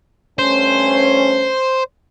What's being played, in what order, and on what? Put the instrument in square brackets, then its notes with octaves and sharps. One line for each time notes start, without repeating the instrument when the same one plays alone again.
[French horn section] G2 A3 C#4 [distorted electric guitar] C5